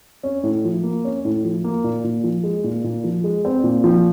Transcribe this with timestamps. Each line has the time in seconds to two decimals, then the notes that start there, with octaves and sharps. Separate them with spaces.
0.23 C#4
0.43 A2
0.64 F3
0.83 A#3
1.05 C#4
1.25 A2
1.44 F3
1.64 A#3
1.84 A#2
2.04 A#2
2.24 F3
2.44 G#3
2.64 A#2
2.84 A#2
3.04 F3
3.24 G#3
3.45 C4
3.64 A#2
3.84 F3